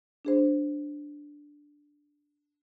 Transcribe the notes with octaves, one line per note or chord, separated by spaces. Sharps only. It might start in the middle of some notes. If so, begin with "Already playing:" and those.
D4 G#4 C5